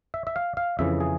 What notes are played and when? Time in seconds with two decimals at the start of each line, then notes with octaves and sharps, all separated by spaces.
0.14 E5
0.27 E5
0.36 F5
0.57 F5
0.79 F2 C#3 E3 E5
1.00 G#4